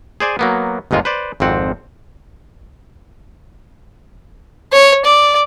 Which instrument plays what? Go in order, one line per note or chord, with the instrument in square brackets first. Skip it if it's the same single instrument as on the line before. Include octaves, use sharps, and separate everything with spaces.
[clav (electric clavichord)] G#4 C5 D5 G#5
F#3 A#3 B3
G1 D#2 G#2 G#3 F4
B4 C5 D5
G#1 F2 C4 F#5
[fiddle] C#5
D5